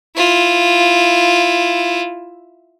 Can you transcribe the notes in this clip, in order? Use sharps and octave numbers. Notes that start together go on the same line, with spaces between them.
E4 F4